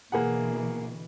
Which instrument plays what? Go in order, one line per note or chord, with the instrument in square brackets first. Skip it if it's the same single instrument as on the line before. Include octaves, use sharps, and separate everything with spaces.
[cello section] B2 D3 E3 [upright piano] A#3 G#4 F#5